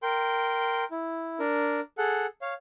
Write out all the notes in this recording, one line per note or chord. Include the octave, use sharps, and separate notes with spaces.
A#4 G5 C6
E4
D4 A#4
G#4 A4 F#5
C#5 F5